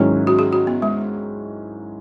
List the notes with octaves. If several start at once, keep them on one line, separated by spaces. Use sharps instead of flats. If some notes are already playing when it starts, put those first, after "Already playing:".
Already playing: G#2 D#3 F#3 C#4 E4
F#4
G#4
F#4
B3
G#3